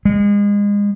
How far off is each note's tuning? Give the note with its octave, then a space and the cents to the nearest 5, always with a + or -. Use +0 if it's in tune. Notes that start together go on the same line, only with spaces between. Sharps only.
G#3 -30